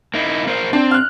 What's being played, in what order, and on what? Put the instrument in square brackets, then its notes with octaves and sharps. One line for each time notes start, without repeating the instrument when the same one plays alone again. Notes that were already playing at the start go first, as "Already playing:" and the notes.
[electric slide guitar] A#3 D#4 E4
A#3 A#4 C5
[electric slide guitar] C4 [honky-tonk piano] D4
[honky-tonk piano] F6 F#6